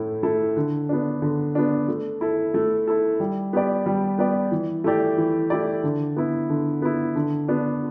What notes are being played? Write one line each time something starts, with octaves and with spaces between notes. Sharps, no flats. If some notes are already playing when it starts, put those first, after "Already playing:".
Already playing: A2 A3 E4
A3 E4 A4
D3
B3 D4
D3
B3 D4
A3
E4 A4
A3
E4 A4
G3
B3 G4 D5
G3
B3 G4 D5
E3
A3 E4 G4 D5
E3
A3 E4 G4 D5
D3
B3 E4
D3
B3 E4
D3
B3 D4